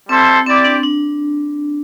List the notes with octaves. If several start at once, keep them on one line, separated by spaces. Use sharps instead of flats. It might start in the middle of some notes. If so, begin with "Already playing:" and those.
G3 C4 E4 A4 C5
C4 E4 G4 D5
D4
D4